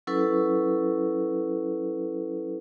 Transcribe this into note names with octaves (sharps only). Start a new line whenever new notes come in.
F#3 C#4 E4 A4 B4